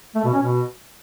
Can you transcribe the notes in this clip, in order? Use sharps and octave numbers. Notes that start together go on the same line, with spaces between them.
A3
B2
C#4
B2